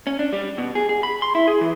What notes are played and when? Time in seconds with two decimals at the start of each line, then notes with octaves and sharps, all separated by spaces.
0.07 C#4
0.19 D4
0.33 G3
0.58 B2
0.75 G#4
0.89 G#4
1.03 B5
1.22 C6
1.35 E4
1.48 G#4
1.61 E3